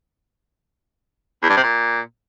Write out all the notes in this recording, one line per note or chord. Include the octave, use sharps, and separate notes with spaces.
E2
G2
C3
A#2